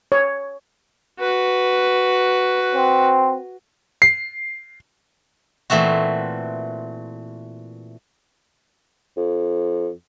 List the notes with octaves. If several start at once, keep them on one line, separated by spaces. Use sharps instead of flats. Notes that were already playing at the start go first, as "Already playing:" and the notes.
C#5
F#4 B4
C4
C7
A#2 E3 A3 C4 F#4
F2